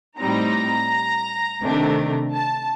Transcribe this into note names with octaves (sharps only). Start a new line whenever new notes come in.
A2 G3 C4 D#4 A#5
C3 D#3 A3 D4
A5